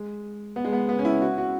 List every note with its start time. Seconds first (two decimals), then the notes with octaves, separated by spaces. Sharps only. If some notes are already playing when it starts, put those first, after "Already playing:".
Already playing: G#3
0.56 B3
0.65 G#3
0.73 B3
0.89 B3
0.99 C#4
1.05 E4
1.22 F#4
1.38 F#4